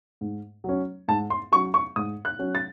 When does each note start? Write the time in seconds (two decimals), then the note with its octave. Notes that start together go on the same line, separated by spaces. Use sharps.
0.21 G#2
0.64 F#3 C#4
1.08 G#2 A5
1.30 C6
1.52 F#3 C#4 C#6
1.74 C#6
1.96 G#2 D#6
2.25 F#6
2.39 F#3 C#4
2.55 A6